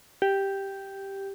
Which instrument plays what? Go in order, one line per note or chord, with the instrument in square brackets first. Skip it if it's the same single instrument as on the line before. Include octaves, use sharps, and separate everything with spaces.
[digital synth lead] G4